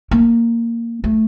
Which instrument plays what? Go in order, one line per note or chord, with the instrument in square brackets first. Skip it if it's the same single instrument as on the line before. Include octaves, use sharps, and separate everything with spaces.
[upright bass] A#3
A3